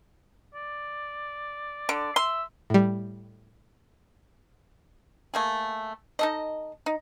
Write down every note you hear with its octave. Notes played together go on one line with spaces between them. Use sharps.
D5
D3
E5 C6
A2 G3
A3 A#3 G#4
D#4 A4 D#5
D#4